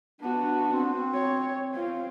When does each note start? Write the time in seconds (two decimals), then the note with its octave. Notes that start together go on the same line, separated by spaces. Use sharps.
0.21 B3 D4 F#4
0.73 C4
1.13 C#5
1.74 C4 F4